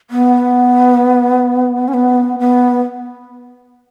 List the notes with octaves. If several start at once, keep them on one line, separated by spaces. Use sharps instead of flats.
B3
C#4
B3
B3